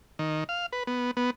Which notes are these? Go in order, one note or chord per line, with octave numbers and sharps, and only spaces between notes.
D#3
F5
B4
B3
B3